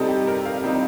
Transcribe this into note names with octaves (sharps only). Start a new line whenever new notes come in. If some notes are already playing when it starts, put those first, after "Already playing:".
Already playing: C3 G3 C4 D#4 A4
G4
A#4
F5
C3 G3 C4 D#4